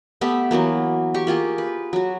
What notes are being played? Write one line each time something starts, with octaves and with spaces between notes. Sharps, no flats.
A3 B3 G4 E5
E3 F#3 A#3 B3
G4 C#6
A#3 F4 G4 G#4
B4
F#3 F#4